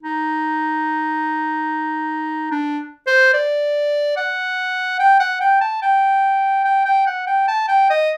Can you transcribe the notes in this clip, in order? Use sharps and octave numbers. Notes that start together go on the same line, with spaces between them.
D#4
D4
C5
D5
F#5
G5
F#5
G5
A5
G5
G5
G5
F#5
G5
A5
G5
D#5